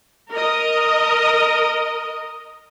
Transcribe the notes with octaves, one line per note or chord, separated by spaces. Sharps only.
A#4 D#5